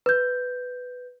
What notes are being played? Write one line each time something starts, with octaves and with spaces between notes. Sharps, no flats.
B4 G6